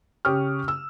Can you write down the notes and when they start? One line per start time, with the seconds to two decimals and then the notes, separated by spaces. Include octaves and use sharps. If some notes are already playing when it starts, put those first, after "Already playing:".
0.25 C#3 G4 C#5 C#6 D#6 F6
0.68 E6